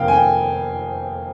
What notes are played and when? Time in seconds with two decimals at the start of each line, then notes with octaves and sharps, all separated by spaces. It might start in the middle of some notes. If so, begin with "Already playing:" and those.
Already playing: F1 F2 D#3 A#3 F5 G5
0.08 G#5
0.13 G5